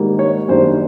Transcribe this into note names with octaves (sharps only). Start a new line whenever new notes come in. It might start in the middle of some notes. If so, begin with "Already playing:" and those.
Already playing: G#2 D#3 G3 A#3
C#5
F#2 D#3 G3 A#3 D4 C5